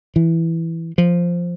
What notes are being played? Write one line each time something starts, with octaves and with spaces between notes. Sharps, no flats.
E3
F3